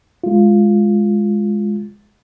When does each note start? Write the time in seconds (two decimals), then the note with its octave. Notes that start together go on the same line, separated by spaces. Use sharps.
0.24 G#3 F4